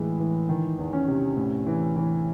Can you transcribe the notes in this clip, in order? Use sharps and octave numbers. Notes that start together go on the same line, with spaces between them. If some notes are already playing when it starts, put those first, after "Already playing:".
Already playing: A2 E3 G#3
E3
D#3
E2
C#4
C3
A2
E3
E3